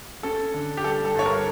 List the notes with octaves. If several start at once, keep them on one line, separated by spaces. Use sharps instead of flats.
C#4 A4
D3
G4
G3 A4
A4
G2 C#5
A#4